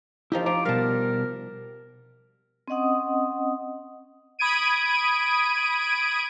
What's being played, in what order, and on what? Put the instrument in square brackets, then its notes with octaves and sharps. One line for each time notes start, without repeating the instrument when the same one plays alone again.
[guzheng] F3 D#4 G4 [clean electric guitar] E4 A#4
[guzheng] F3 [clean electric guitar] A#5 [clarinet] D6
[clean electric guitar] B2 G3 [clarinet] A#4 [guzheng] F5 A5
[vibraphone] C4 C#4 D#5 F#5 D#6
[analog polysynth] B5 D#6 G#6 D7 D#7